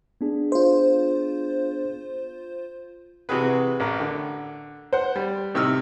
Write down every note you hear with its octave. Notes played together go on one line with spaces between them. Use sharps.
B3 D4 G#4
F4 C5
C3 E3 F#4 G#4 B4
A1 A#4
D3
C5 F#5
G3
A2 C3 D#4 E6 F6